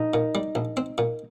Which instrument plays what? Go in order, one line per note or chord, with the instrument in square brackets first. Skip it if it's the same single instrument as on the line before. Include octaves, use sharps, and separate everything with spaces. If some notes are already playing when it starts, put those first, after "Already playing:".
Already playing: [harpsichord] A#1 [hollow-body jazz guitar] D#4
[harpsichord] A#2
G3
A#1
C4
A#2